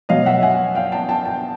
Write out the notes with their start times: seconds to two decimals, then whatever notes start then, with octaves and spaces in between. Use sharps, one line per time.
0.09 B2 F#3 D#5 F5
0.26 E5 F#5
0.42 F#5 G#5
0.75 F5 G5
0.92 G5 A5
1.09 G5 A5
1.25 G5 A5